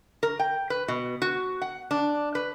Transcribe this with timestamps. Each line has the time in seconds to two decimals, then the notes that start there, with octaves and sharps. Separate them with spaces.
0.23 A#4
0.40 G5
0.70 B4
0.88 B2
1.22 F#4
1.62 F#5
1.91 D4
2.35 B4